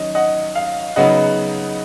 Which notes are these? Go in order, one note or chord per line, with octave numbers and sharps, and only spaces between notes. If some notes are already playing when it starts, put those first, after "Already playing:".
Already playing: D#3 F#3 C#4 D#5
D#5 F#5
F5
C#3 F#3 B3 D#4 D#5 F#5